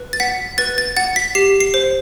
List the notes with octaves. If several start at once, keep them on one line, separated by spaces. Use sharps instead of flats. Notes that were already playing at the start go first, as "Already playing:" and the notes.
Already playing: B4
A6
F#5 B6
B4 A6
A6
F#5 A6
B6
G4 C7
C7
C5